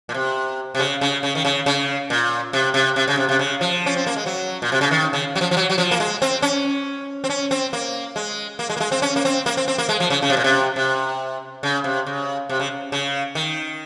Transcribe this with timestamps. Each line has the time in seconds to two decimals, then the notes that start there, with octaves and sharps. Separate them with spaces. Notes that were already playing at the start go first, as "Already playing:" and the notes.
0.09 A#2
0.14 C3
0.75 C3
0.79 C#3
1.01 C#3
1.23 C#3
1.35 D#3
1.45 C#3
1.66 C#3
2.10 A#2
2.53 C3
2.74 C3
2.96 C3
3.08 C#3
3.17 C3
3.29 C3
3.39 C#3
3.61 F3
3.86 C#4
3.96 C4
4.07 A#3
4.16 G#3
4.26 F#3
4.62 A#2
4.72 C3
4.81 C#3
4.91 D#3
5.13 C#3
5.35 F#3
5.41 F3
5.51 F3
5.57 F#3
5.70 F#3
5.78 F3
5.91 A#3
6.00 G#3
6.22 C4
6.42 C#4
7.24 C4
7.30 C#4
7.51 C4
7.73 A#3
8.16 G#3
8.59 A#3
8.70 G#3
8.77 A#3
8.80 G#3
8.92 C4
9.02 C#4
9.16 A#3
9.25 C4
9.46 A#3
9.57 C4
9.68 C4
9.78 A#3
9.89 G#3
10.00 F3
10.10 C#3
10.22 C#3
10.30 C3
10.37 A#2
10.44 C3
10.76 C3
11.63 C#3
11.84 C3
12.07 C#3
12.49 C3
12.59 C#3
12.92 C#3
13.35 D#3